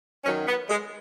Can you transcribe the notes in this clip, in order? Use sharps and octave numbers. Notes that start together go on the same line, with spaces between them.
F#2 D#3 F#3 C#4
B3
G#3